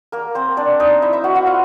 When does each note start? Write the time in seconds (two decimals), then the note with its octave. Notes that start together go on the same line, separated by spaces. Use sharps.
0.12 A#3 A#4
0.35 C4 C5
0.57 D4 D5
0.80 D#4 D#5
1.02 E4 E5
1.13 E4 E5
1.24 F#4 F#5
1.35 F#4 F#5
1.46 F4 F5